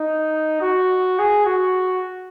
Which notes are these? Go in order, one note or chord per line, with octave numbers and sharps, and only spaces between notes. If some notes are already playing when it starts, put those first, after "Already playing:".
Already playing: D#4
F#4
G#4
F#4